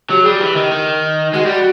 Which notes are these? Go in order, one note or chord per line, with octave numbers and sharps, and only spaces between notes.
F#3 G4
G3 G#4
G4
E3
D#3
D#3
G#3 F#4
G3 G4
F#4